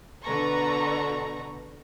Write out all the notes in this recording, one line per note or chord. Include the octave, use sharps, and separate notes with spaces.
B2 D3 A4 B4 A#5 C#6